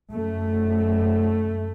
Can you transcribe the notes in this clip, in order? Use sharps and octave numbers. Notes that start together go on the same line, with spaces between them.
F#2 A3